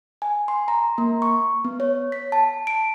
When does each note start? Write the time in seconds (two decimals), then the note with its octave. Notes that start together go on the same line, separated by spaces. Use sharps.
0.22 G#5
0.48 C6
0.68 A#5
0.98 A#3
1.22 C#6
1.65 B3
1.80 C#5
2.12 B6
2.32 A5
2.67 D7